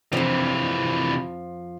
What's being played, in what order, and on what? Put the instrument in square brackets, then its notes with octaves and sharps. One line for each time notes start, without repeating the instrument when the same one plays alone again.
[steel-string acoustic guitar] F2 F3 [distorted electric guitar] C3 E3